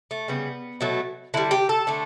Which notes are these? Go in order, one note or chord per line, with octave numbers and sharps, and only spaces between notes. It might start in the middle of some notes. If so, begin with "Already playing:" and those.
A3
C#3 G3 B3
B2 F#3 A3
D3 G3 E4
G4
A4
D3 A3